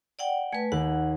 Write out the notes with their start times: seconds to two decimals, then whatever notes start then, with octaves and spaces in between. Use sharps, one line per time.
0.19 D5 F#5 G5
0.53 A3 B4 G#5
0.72 D#2 B4 F#5